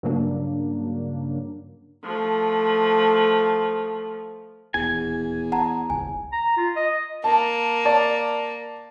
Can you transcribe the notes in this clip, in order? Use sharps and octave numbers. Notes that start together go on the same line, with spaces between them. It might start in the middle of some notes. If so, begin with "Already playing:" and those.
G2 C#3 F#3 A#3 D4
F3 A3
D#1 E2 G#5
F#5 A5 A#5
D#1 G#1 C#2 G#5
A#5
F4
D#5
A#3 A5
D5 A5